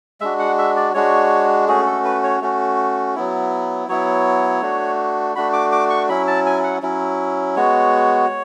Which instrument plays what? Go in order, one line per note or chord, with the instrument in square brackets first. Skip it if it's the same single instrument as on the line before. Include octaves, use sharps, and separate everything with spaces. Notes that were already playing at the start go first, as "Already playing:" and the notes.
[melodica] G#3 D4 F#4 E5
F#5
E5
D5
G#3 D4 F#4 C#5
A3 C#4 F#4 G#4
A4
B4
C#5
A3 C#4 F#4
F#3 B3 E4
F#3 B3 E4 C#5
A3 D4 F#4
A3 D4 F#4 B5
D6
D6
C#6
F#3 C#4 E4 B5
A5
G#5
F#5
F#3 C#4 E4
G#3 B3 F#4 C#5